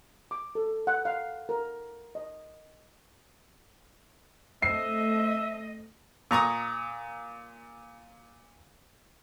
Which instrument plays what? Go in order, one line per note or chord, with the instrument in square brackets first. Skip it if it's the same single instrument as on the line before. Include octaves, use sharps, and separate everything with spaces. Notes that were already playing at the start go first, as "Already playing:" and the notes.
[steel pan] D6
A4
F#5
F5
A#4
D#5
[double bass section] A3 C4 [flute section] D#5 [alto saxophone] E5 [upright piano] C7
[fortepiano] A#2 A#5 C#6 D#6